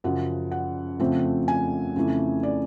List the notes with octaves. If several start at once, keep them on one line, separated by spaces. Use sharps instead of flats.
F#2 C#3 F3 F#5
F#5
F2 C#3 F3 A3 C4
G#5
F2 C#3 E3 A3
D5